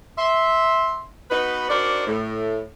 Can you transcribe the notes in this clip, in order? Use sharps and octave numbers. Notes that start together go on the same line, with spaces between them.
E5 C6
B3 D#4 F#4 B4
D4 D#4 F#4 A#4 C5 D5
A2